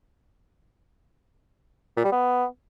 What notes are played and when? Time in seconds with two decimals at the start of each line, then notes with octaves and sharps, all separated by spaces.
1.97 A#2
2.04 G3
2.12 B3